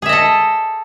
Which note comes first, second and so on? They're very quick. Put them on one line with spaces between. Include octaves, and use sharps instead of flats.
G#4 E5 D#5 A4